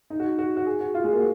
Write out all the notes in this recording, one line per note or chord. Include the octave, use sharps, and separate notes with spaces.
D#4
F#4
D#4
F#4
F#4
G#4
F#4
F4
G#3
A#3
F#4